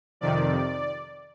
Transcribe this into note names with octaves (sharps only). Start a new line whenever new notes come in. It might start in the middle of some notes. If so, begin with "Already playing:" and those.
F2 C3 D#3 D5